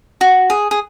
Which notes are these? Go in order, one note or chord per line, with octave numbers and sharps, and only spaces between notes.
F#4
G#4
G#4